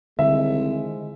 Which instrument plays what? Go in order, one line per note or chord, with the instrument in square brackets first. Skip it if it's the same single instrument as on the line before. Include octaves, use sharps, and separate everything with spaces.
[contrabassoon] C2 [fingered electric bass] D3 [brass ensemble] D#3 F3 G#3 [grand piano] E5